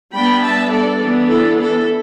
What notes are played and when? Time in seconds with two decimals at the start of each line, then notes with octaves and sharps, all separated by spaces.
0.12 G3 B3 D4 G5 B5
0.41 E5 A5
0.70 A4 D5
0.99 E3 B3 D4
1.27 E4 A4
1.57 E4 A4